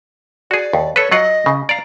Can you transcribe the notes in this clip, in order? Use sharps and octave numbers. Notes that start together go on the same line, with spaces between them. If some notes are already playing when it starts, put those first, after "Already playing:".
F#4 G#4 D5
D#2
A4 B4 C#5
F#3 F4 D#5 F#5
C#3
D5 F5 A#5